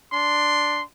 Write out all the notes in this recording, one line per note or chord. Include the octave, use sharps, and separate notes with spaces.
D4 C6